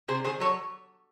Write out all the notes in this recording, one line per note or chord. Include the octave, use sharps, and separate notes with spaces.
C3 G#4 C5
D#3 G#4 C5
F#3 A4 C#5